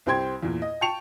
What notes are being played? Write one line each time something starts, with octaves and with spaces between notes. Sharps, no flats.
C2 C4 G4 G5 C6 G#6
E2 A#2
D#5
G5 A5 C#6 C#7 F7